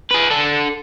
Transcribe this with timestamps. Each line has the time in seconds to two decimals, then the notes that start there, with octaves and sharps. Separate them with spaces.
0.11 G#4 B4
0.30 D4 A4